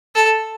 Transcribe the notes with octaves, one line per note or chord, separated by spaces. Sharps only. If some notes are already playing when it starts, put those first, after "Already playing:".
A4